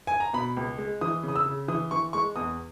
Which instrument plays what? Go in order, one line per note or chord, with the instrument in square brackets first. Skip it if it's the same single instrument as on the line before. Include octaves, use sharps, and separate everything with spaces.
[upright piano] G#5
A#5
B2 B5
C#2
G#3
E3 D#6
C#3
D#6
E6
C#3
E3 D#6
E3 C#6
G#3 C#6
E2 D#6